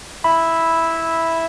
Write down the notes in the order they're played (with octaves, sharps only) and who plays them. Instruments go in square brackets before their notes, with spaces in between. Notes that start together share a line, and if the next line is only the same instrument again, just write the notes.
[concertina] E4 E5 [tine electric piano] B5